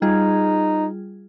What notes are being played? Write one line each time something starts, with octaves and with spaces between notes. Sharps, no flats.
G3 D#4 F4 G#4